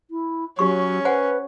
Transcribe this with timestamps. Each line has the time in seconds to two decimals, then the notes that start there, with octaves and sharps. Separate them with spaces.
0.11 E4
0.59 F#3 C#4 G4 C#6
1.05 B4 C5 F#5 G#5